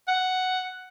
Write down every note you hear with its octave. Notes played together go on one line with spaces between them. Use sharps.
F#5